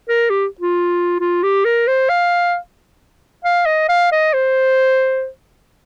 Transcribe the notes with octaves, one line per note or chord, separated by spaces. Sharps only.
A#4
G4
F4
F4
G4
A#4
C5
F5
F5
D#5
F5
D#5
C5